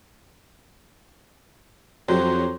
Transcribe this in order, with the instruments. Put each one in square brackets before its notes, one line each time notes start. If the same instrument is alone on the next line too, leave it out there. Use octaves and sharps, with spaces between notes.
[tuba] F2 [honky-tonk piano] F#3 G4 [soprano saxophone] C5